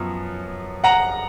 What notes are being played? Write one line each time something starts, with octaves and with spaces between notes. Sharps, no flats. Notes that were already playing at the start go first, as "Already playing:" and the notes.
Already playing: F#2 F3 B3
F#5 A#5